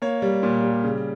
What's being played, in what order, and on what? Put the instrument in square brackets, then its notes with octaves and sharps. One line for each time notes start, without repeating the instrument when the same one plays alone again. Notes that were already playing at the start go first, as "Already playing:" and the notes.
[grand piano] A#3 C#5
G3
A#2
G3
C#3